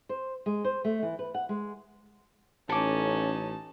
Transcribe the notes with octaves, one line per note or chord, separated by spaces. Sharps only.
C5
G#3
C5
A3
E3
B4
F#5
G#3
A1 C#4 D#4 A4 A5 D6